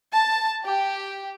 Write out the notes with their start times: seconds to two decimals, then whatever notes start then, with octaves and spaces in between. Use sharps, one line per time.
0.12 A5
0.64 G4